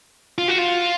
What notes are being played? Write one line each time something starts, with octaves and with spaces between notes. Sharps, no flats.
F4
F#4
F4